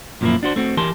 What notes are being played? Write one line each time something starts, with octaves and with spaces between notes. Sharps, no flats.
F#2 A#2 F3 G#3 A#3 E4
D4 F#4 C5
A3 C4 F#4
E3 G4 A#4 A5 C6